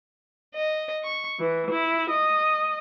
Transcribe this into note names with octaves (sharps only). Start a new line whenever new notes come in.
D#5
C#6
E3
E4
D#5